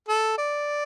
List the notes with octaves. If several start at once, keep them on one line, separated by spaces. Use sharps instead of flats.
A4
D5